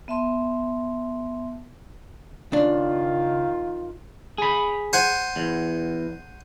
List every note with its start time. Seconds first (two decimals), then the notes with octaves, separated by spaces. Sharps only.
0.08 B3 E5 A5 C6
2.52 C#2 D#3 D4 F4
4.38 G#4 B5
4.93 C5 F#5 G#5
5.36 E2